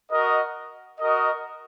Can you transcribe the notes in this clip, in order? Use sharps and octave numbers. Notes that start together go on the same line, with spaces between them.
F#4 A#4 D#5
F#4 A#4 D#5